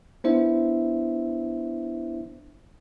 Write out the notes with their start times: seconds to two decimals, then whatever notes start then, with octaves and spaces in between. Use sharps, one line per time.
0.24 B3 D4 E4 C5 E5